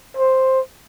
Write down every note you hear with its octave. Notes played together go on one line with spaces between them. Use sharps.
C5